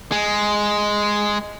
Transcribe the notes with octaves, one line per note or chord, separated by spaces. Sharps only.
G#3